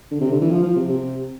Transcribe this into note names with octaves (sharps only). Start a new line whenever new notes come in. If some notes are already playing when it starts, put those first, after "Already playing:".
D3
C3
D3
E3
F3
F3
C3
C3